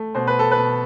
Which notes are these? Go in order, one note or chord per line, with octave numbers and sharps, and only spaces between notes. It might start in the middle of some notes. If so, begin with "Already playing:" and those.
Already playing: A3
B2 C5
B4
A4
B4
B2